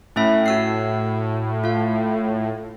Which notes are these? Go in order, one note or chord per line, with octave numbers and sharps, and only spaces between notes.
A2 C#4 E4 E5
F#4 E6 C7
F4 F5